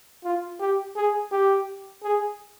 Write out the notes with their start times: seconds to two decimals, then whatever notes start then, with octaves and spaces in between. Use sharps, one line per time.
0.24 F4
0.60 G4
0.96 G#4
1.32 G4
2.03 G#4